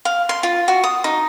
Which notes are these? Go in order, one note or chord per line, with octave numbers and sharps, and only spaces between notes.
F5
C6
F4
F#4
D#6
D#4